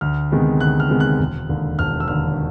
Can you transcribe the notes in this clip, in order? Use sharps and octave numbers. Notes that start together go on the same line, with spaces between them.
D2 F6
C3 D#3 G#3 B3
D2 F#6
F6
C3 D#3 G#3 B3
F#6
E1
D#2 D3
E1 F6
E6
D#2 D3 F6